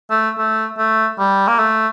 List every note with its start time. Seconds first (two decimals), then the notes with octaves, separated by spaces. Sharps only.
0.10 A3
0.38 A3
0.78 A3
1.19 G3
1.48 A#3
1.59 A3